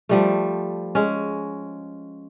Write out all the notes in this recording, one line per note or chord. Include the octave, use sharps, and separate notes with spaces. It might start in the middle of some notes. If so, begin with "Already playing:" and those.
F3 G3 A3
G#3 C#4